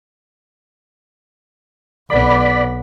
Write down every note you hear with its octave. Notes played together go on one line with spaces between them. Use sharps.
B1 B3 D5 B5